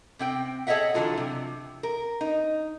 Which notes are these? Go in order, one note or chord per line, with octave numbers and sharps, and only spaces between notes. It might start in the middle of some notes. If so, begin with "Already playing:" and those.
C3 C4 G5
G#4 A4 C#5 D#5 E5 F#5
D3 E3 F#3 F4 A4
C3
A#4
D#4